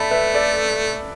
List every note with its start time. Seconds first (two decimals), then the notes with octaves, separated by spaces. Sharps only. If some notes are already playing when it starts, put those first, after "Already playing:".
Already playing: A3 D5 E5 A5 B5
0.11 B4 E5
0.34 A4 D5